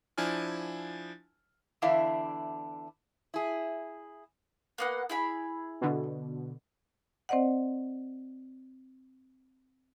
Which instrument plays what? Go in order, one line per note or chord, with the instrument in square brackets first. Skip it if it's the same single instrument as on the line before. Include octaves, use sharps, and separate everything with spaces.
[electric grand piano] F3 D4 E4 G#5 F6
[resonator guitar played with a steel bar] E2 D3 D4 E4 E5 F5
E4 G#4
[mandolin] A#3 B3 F#5
E4 G#4 B5
[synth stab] B2 D3
[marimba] C4 C5 D5 D#5 F#5